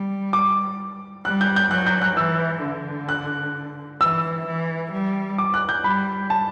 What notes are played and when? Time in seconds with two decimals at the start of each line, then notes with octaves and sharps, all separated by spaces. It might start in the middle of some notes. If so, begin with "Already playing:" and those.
Already playing: G3
0.33 D6
1.25 G3 F#6
1.41 G6
1.56 G6
1.71 F#3 F#6
1.86 G6
2.01 F#6
2.16 E3 E6
2.63 D3
3.09 F#6
4.01 E3 E6
4.47 E3
4.92 G3
5.38 D6
5.54 F#6
5.69 G6
5.84 G3 B5
6.30 A5